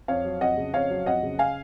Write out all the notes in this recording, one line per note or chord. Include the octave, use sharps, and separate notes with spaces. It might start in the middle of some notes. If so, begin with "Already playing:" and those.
F2 C#5 F5
F#3
F2 D#5 F#5
C#3
F2 C#5 F5
F#3
F2 D#5 F#5
C#3
F5 G#5